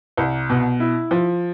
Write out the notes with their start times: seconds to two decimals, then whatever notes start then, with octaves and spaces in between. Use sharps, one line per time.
0.17 C2
0.49 B2
0.80 E4
1.11 F3